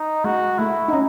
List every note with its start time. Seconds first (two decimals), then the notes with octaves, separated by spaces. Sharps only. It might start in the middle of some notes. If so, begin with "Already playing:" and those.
Already playing: D#4
0.24 G#3 F#4
0.59 A3 E4
0.88 D#4
0.93 C#4